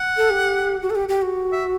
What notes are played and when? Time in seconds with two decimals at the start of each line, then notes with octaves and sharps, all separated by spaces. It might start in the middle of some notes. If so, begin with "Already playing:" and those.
Already playing: F#5
0.17 A4
0.30 G4
0.82 F#4
0.90 A4
0.95 G4
1.09 G4
1.22 F#4
1.52 E5